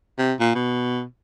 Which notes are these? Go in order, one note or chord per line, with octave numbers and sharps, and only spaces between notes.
C3
A#2
B2